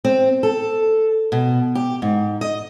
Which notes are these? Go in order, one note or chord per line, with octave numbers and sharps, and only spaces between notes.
C4
A4
B2
G4
G#2
D#5